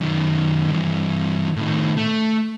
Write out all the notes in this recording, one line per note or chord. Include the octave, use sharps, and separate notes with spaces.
F#2 D#3
G2 E3
A2 D#3
A3